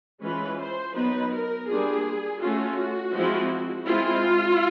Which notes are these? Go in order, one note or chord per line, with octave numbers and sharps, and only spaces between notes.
E3 G#3 C#4 F4 B4
C5
F#3 B3 D#4 B4
A#4
G3 A#3 D4 F4 G#4
A3 C#4 F4 F#4
F3 G#3 C4 E4
G#3 C4 E4 F4